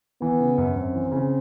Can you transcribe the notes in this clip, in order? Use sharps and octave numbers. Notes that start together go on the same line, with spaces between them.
E3 B3
C#3
F#2
F#2 C4
E3
C#3